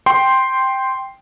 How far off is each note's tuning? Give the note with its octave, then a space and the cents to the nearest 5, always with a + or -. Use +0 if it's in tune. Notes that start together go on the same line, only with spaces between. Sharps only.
G5 +0 C6 +0